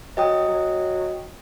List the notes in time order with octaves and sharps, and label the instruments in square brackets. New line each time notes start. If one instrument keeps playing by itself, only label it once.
[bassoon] F#3 [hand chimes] D#5 G5 D#6
[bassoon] F#3